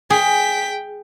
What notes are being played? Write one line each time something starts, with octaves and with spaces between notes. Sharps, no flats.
G#4 G5 B6